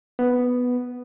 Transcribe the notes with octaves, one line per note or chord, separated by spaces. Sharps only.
B3